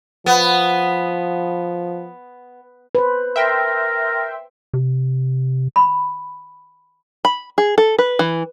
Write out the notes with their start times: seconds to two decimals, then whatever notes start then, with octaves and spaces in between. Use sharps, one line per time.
0.26 F3 B3
2.95 B4 C5
3.36 A#4 E5 G5 C6
4.73 C3
5.76 B5
7.25 B5
7.58 G#4
7.78 A4
7.99 B4
8.19 E3